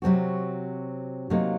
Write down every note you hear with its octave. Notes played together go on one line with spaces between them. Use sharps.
C3 F#3 C4 F#4
C3 F#3 A#3 D#4